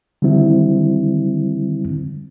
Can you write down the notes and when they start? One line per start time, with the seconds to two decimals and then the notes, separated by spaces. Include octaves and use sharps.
0.22 D3 D#3 F#3 G3 C4 E4